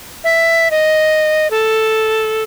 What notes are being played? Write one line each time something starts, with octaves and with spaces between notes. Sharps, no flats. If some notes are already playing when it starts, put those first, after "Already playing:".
E5
D#5
A4